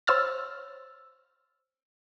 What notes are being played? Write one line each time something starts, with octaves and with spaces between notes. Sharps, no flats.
C5 C#5 E6 F6 A6